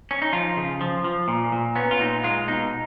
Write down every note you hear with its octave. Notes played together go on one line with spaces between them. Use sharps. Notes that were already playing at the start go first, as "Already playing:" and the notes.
C#4
D#4
F3 F4
C#3
F3
F3
A#2
A#2
B3 C#4
F4
A#2 D#4
G#3 F4
B2 D#4